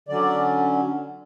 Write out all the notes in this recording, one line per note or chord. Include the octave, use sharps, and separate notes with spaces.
D3 F#3 C#4 D5